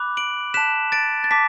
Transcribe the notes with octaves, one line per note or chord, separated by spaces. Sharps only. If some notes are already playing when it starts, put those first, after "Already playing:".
Already playing: B5 D6 F#6
D7 F#7
A5 F#6 B6 E7
A6 D7
A6
A5 D6 B6